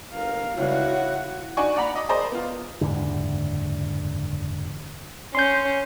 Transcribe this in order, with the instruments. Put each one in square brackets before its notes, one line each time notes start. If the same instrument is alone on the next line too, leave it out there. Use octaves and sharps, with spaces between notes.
[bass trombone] G1 [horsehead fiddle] A#4 F5
[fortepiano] C#2 G3 [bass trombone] E4 [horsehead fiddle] F#4 F#5 [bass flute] C#5
[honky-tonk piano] D4 D#4 F#4 D5 G#5 C#6
D5 F#5 A#5 B5
D#5 B5 D6
G#4 A#4 C5 D5 D#5
B3 F4
[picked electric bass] F#1 E2 G#2 D3
[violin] C#4 [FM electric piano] C6 G6